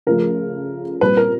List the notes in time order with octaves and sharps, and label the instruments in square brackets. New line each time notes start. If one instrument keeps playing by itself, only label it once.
[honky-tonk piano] C#3 F3 A3 [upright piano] A#4
[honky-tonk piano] A#2 G3 C4 [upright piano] B4
[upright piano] A#4